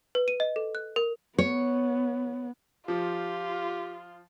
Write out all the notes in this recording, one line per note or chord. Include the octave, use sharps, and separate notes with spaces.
B4
D#7
D#5
A4
F#6
A#4
B3 C#5
F3 F4 G4